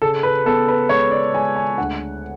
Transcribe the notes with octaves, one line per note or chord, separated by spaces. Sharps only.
C#3 A4
B4
B3 A4
B4
G#3 C#5
D5
G#3 G#5
G#5
D2 F#5